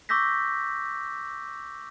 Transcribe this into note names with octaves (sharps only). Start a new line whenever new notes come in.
C#6 D6 E6 G6 A#6 B6